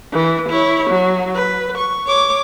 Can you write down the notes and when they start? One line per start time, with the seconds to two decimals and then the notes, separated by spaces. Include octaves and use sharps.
0.12 E3
0.49 E4 C#5
0.90 F#3
1.35 B4
1.78 C#6
2.07 C#5 D6